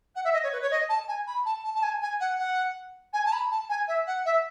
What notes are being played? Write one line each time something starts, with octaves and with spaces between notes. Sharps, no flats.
F#5
E5
D#5
C#5
B4
C#5
D#5
A5
G#5
B5
A5
A5
A5
G#5
G#5
F#5
F#5
G#5
A5
B5
A5
G#5
E5
F#5
E5